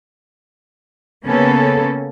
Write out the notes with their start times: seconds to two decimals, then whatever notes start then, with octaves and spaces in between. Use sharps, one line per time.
1.25 C#3 A#3 B3 C#4 A4